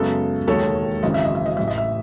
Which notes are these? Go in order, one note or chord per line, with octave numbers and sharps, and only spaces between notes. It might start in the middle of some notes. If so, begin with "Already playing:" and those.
Already playing: F#2 C#3 G#3 B3 A4
E1 D#2 D#3 G#3 A4 C#5
G#1 F#2 C#3 E3 D#5
E5
D#5
E5
D#5
A1 A2 E3 E5
D#5
E5